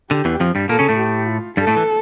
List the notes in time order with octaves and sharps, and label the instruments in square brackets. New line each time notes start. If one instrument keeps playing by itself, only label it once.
[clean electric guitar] D3 [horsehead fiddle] G4
[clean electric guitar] E2 E3
F2 F3
G2 G3
[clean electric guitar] A#2 A#3 [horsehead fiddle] A4
[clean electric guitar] C#3 C#4
A2 A3
[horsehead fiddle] G4
F4
[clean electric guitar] G2 G3 [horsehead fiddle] A4
[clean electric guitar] A2 A3
E3